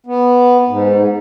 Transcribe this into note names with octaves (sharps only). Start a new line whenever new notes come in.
B3
G#2